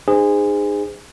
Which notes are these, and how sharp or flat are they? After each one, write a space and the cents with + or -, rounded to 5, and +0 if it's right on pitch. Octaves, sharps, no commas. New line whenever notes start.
D#4 -35 G#4 -20 C5 -30